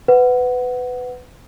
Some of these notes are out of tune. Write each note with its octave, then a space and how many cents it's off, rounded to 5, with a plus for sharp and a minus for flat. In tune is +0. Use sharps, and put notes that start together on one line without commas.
B4 +20 F#5 +0